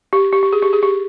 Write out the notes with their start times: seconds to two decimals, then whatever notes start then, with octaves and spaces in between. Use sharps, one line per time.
0.13 G4
0.33 G4
0.43 G4
0.53 G#4
0.62 G4
0.73 G#4
0.83 G4